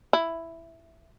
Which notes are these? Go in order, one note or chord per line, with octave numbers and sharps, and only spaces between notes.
E4